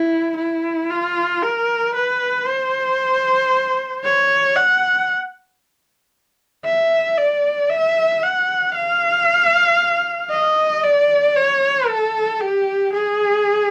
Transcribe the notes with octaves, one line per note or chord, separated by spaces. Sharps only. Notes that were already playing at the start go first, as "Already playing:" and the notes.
Already playing: E4
E4
F4
A#4
B4
C5
C#5
F#5
E5
D5
E5
F#5
F5
D#5
D5
C#5
A4
G4
G#4